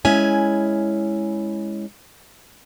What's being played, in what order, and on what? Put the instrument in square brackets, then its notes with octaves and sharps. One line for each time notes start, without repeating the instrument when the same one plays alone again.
[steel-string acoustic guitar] G#3 C#4 E4 G#5